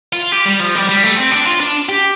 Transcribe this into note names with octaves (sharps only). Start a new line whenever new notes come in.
F4
G4
G3
F3
G3
G3
A3
C4
D4
F4
D4
G4